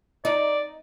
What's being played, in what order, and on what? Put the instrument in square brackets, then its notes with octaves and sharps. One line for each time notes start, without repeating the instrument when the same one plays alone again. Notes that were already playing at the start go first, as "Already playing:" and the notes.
[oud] D#4 [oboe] D5